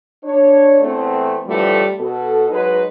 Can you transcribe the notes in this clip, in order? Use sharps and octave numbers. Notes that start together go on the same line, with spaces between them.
D4 C#5
E2 A3 C4
A2 D3 E3 F3 G3 A3
B2 A4
F#3 G#3 D#4 B4